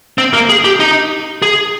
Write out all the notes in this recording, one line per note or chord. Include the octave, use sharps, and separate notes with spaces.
C4
A#3
G#4
G4
D#4
G#4